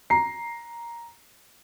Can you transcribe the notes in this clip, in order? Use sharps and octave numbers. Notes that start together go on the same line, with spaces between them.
A#5 C7